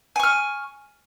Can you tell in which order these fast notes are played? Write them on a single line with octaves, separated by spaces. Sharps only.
G#5 C#6 F6